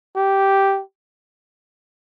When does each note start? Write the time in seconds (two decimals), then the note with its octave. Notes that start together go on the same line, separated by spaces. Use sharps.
0.16 G4